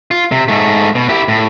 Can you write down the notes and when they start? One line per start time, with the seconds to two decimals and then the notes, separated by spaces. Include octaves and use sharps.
0.11 F4
0.32 C3
0.48 G#2 A3
0.95 B2
1.09 E4 G4
1.28 A2